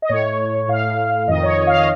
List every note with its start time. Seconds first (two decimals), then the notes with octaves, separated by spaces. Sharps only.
0.02 D#5
0.09 A2 C#5
0.68 A2 F5
1.28 F2 D#3 D#5
1.43 C#5
1.67 F5
1.78 D#5